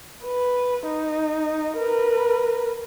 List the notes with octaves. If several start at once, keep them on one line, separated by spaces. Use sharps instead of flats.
B4
D#4
A#4 B4